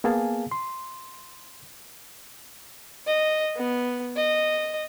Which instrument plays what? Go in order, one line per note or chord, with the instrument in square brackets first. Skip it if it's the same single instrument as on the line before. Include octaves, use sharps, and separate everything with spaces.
[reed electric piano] A#3 B3 G#4 F5 G#5 A5
C6
[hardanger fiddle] D#5
B3
D#5